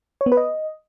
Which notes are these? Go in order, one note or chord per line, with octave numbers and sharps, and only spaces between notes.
C#5
B3
B4
D#5